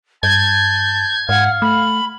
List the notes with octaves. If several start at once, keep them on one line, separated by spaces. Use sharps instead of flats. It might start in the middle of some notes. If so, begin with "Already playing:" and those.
G2 A5 G6 G#6
G#2 F5 F#5
A3 B5